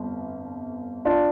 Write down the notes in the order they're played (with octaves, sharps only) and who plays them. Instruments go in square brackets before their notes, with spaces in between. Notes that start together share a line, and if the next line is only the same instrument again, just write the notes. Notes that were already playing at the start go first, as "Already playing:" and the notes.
Already playing: [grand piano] G1 F2
D4 F4